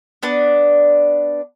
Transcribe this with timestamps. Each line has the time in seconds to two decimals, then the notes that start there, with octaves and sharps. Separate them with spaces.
0.23 B3 D4 D5